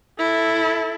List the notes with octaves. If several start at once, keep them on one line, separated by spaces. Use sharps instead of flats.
E4 A4